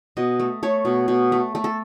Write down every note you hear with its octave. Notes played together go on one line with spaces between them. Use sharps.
B2 D#5
A3
A3 C#5
B2
B2
A3
A3
A4